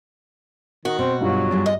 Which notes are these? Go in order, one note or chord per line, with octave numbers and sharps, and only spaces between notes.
D#3 F#4
B2 C4
G2 F#3 F4
G3 G#3 D5
D#5